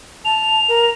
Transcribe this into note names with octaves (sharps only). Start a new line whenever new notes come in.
A5 F7
A#4